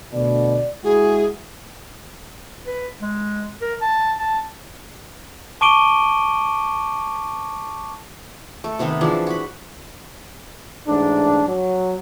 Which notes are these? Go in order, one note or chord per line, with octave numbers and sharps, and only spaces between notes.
D2 B2 D5
G#3 E4 F#4 G#4
B4
G#3
A#4
A5
A5
A5 C#6 D6 D7 D#7 G7
A3
C3 D#3 B3 C4
E3 F3 D4 G#4
F#4 B5
A1 G#2 D4
F#3